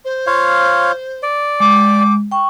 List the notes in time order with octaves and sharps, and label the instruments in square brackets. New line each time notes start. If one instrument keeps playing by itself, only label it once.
[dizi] C5
[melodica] F4 C#5 F5
D5
[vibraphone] G#3 [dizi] D6
[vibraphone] G5 C#6